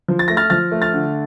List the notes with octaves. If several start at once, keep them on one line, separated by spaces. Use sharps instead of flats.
F3
A6
A3 A#6
F6 A6
F3 F6 A6
A3
F6 A6
D3